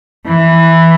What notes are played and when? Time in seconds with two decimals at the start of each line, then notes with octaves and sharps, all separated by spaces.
0.26 E3